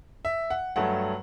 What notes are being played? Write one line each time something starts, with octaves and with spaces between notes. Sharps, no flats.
E5
F#5
G2 F#3 A3 F#5